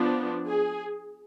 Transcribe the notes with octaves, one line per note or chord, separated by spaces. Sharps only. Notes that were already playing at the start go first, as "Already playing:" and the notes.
Already playing: F3 B3 D4
G#4